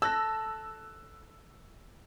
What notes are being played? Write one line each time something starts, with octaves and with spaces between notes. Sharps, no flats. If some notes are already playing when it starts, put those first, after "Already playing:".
A4 E6 F#6 A#6